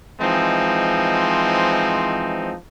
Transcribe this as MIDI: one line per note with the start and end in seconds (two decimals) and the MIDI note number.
0.21 2.56 52
0.21 2.56 53
0.21 2.56 56
0.21 2.56 60
0.21 2.56 63